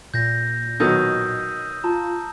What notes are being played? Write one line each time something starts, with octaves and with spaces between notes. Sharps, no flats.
A#2 G6 A#6
B2 D#3 F#3 D#6 E6 G6
F4 A5 A#5